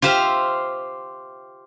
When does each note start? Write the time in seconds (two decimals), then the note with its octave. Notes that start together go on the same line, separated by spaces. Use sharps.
0.02 F4 G4 C5 E5 F5